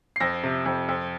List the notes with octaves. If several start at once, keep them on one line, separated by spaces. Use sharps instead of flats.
C7
F2 A#6
C3
F2
F2